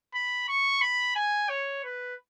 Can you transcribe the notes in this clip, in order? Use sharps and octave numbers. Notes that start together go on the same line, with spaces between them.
B5
C#6
B5
G#5
C#5
B4